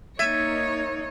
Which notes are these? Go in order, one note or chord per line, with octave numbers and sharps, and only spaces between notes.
A#3 D#4 C#5 E5 G#6 A6 D#7